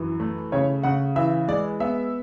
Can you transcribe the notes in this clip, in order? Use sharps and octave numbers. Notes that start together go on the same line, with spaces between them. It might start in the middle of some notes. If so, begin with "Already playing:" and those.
Already playing: F#2 E3
A3
C#3 C#5
C#3 F#5
E3 E5
G#3 D5
B3 E5